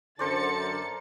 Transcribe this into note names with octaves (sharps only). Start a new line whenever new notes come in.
F#2 D3 A4 A#4 C5 D5 A6 C#7